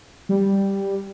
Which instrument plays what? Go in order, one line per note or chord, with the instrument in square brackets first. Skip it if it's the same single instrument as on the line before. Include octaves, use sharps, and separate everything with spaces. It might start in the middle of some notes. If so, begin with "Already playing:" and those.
[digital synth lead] G3